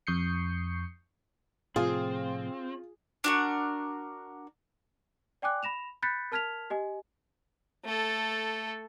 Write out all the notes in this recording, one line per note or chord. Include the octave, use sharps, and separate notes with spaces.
F2 C#6 D#6 G6 C7 C#7
A2 C3 F3 C4 F4 G#4
D4 F#4 A#4
D5 G5 G#5 D6 F#6
B5 A#6 E7 F7
B5 F#6 G6 A6 B6 C#7
A#4 A5 F6 G#6 B6 F7
G4 D#5 G#5
A3 A4